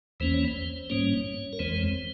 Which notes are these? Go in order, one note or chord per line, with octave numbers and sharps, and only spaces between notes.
E2 E3 A#3 C#4 C5
C#5
C5
G#2 G3 A#3 C#4 C#5
A#4
F2 E3 G#3 C4 C5